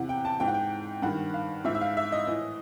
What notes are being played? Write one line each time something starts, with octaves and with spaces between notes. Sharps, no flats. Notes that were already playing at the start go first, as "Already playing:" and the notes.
Already playing: E2 C3 E3 F#5
G5
A5
G#2 E3 G5
F#5
G5
G2 D#3 F#5
F5
G#2 E3 E5
E5
F5
E5
D#5
A2 E3